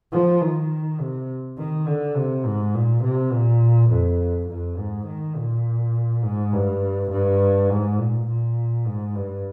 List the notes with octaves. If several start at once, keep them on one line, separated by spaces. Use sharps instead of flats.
F3
D#3
C3
D#3
D3
C3
G#2
A#2
C3
A#2
F2
F2
G#2
D#3
A#2
G#2
G2
G2
G#2
A#2
A#2
G#2
G2